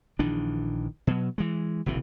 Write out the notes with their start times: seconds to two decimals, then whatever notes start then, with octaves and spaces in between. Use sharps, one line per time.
0.19 A#1 D#3 E3 D4
1.07 B2 F#3
1.38 E3 G#3
1.86 F#1 B1 C3 E3